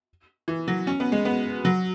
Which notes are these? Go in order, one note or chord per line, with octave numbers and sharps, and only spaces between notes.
E3
F#3
C#4
B3
G#3
B3
F#3